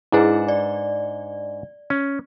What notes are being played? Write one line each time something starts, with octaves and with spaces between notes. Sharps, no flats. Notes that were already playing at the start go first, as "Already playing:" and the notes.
G#2 D4 E4 G#4 B4
D5
C#4